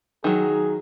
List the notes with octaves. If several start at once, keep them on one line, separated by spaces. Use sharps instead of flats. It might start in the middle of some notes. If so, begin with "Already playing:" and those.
D#3 F#3 G#4